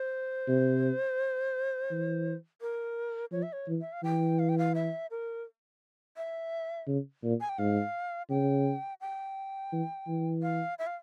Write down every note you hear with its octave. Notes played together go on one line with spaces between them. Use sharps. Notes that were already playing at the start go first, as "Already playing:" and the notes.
Already playing: C5
C3
E3
A#4
F3 C#5
E5
C#5
E3
E5
F5
E3 G5
F5
G5
F5
E5
A#4
E5
C#3
A#2
G#5
G5
G#2 F5
C#3 G5
G5
E3
E3
F5
E5
F5